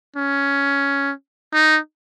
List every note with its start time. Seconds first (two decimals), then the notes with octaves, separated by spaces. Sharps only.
0.16 C#4
1.54 D#4